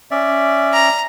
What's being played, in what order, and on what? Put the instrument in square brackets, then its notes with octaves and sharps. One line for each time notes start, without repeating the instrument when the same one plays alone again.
[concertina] C#4 D5 E5
[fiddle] A#5